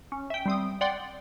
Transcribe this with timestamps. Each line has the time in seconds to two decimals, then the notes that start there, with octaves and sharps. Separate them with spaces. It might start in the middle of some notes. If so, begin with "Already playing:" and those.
0.12 C#4
0.30 E5 G5
0.46 G3 C4 D#6
0.81 D5 F#5 G5 C6